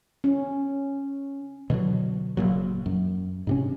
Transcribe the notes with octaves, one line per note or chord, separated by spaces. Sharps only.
C#4
B2 D3 E3 F#3
F#1 B1 A#2 F#3
F#2
G#2 C3 C#4